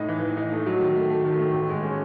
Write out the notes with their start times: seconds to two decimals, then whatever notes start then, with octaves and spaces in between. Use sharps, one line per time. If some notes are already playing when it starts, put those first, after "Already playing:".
Already playing: A2 D#4
0.08 E3
0.23 E3
0.37 D#4
0.52 A3
0.66 F#3
0.81 D#3
0.96 A3
1.10 A3
1.25 D#3
1.39 A3
1.54 A1
1.69 G#3
1.83 C#4